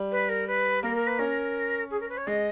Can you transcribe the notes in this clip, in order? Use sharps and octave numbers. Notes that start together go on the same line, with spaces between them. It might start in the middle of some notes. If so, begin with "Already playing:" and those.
Already playing: G3
B4
A#4
B4
A#3 A#4
A#4
B4
C#4 A#4
G#4
A#4
B4
C#5
G#3 D#5